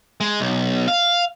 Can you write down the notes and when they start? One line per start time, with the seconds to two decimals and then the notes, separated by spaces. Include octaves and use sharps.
0.21 G#3
0.40 B1
0.88 F5